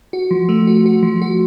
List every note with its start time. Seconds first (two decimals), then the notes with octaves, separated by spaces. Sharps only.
0.13 F#4
0.31 F3
0.49 A3
0.67 F#4
0.86 F#4
1.03 F3
1.22 F#4